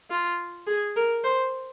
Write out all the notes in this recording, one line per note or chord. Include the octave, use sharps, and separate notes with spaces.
F4
G#4
A#4
C5